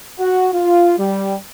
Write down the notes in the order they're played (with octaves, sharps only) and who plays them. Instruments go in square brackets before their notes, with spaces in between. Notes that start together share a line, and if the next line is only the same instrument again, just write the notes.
[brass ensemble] F#4
F4
G3